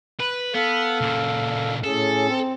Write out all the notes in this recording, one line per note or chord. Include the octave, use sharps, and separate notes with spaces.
B4
B3 A4 F5
A#2 C#3
A2 C#4 G#4 A4
C4